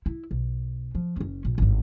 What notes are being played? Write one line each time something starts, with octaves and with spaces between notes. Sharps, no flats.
E4
B1
F3
F#1 C#4
A#1
G#1 G2